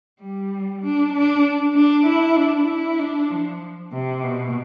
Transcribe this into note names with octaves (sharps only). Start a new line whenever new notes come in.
G3
D4
D4
D4
E4
D4
E4
D4
F3
C3
B2